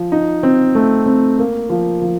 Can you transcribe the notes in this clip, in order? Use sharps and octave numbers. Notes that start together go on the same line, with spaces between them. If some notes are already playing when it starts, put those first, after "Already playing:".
Already playing: F3
D#4
C4
A3
C4
A#3
F3
F3